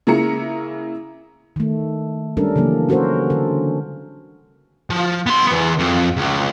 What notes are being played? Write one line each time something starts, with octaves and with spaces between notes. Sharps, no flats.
C#3 A#3 E4 A#5 C#7
D#3 A3
G3 G#3 C#4 D4 A4 A#4
C#3 E3 F#3 A#3
C#4 F#4 A4 A#4 C5
D3 A4
F3
B3 C6
E3 B3
F2
C#2